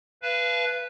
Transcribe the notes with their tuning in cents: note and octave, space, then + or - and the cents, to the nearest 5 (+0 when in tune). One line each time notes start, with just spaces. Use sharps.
B4 +0 F5 -30 A5 -35